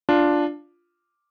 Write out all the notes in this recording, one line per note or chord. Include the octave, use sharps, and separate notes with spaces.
D4 F4